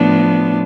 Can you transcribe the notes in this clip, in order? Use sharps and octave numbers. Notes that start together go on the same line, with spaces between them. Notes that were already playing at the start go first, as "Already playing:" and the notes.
Already playing: A2 F3 B3 D4